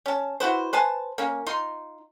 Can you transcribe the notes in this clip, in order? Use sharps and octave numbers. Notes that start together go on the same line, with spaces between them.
C#4 A5
E4 F#4 B4 C5
B4 C5 G#5 A5
A#3 C#4
D#4 F4 C6